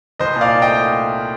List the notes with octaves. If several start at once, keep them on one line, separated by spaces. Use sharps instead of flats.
C2 C5 D#5
A#2
D5 F5
D#4
D#5 G5
A3